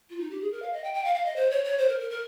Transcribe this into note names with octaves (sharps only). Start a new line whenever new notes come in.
F4
D#4
G4
G#4
A#4
F5
D#5
G5
G5
F5
F5
D#5
C5
C#5
C#5
C5
A#4
A#4
A#4